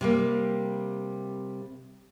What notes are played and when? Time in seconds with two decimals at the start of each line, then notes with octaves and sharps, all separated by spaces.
0.01 C3 G3 A#3